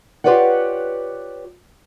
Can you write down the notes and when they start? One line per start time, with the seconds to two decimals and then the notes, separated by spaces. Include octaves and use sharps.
0.24 F4 G4 B4 C#5 D5 F#5